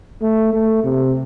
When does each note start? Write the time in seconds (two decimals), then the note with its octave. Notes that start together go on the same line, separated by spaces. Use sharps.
0.22 A3
0.52 A3
0.84 C3